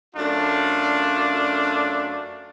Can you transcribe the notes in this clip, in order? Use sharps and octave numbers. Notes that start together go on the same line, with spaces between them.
F#2 A3 D4 F4